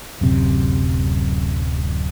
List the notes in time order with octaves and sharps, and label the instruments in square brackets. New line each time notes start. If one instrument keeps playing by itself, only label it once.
[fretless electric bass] D1 F#2 C3